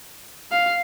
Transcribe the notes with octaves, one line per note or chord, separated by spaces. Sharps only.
F5